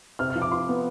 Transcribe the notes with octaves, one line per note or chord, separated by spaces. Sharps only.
C3 F6
F6
F3
D6
F4 C6
B3